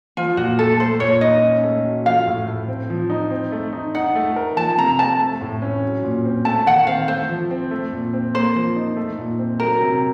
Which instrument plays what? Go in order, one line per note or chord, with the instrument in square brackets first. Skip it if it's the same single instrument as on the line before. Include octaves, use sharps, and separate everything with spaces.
[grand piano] F3 [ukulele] F4
[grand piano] A#2 [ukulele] F#4
[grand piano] A3 [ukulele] A4
[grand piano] A3 [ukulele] C5
[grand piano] A#2 [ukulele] C#5
[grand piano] D#4 [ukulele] D#5
[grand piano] C#4
A3
F#4
[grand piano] F3 [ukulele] F5
[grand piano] A2
A3
C4
F3
D#4
C4
A3
D#4
[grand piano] D#4 [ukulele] F#5
[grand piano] A3
A#4
[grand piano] F3 [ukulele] A5
[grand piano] C3 [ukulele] A#5
[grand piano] C4 [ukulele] A5
[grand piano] A3
A2
C#4
F#3
A#2
C4
[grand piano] A3 [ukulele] A5
[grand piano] D#3 [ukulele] F#5
[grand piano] C4 [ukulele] F5
[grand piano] A3 [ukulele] C5
[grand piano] F3
C4
A3
A#2
C4
[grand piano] A#3 [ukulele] C5
[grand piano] F3
D#4
A3
A#2
C4
[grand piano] F#3 [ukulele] A#4
[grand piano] C3